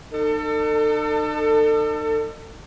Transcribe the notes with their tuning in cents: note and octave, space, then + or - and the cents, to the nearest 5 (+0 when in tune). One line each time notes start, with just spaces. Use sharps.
D#4 -45 A4 +30